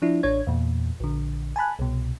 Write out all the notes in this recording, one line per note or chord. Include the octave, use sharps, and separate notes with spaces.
F3 D4 E4
A1 D4 C#5 G#6
E2 A#2
A#1 D3
G#5 A5 B5 F#6
C2 B2